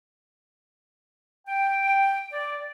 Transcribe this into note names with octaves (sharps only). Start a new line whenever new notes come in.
G5
D5